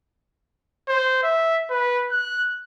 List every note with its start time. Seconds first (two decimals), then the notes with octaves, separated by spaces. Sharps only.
0.88 C5
1.23 E5
1.70 B4
2.11 F#6